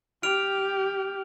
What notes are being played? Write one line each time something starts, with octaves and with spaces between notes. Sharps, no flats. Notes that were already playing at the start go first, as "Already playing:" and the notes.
G4 F6 D7 F7